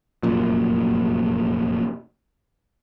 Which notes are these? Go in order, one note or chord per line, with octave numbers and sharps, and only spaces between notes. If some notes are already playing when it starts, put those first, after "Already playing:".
F1 F#2 A#2